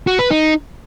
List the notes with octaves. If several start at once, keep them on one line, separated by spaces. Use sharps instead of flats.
F#4
B4
D#4